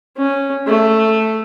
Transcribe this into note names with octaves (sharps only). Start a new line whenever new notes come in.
C#4
A3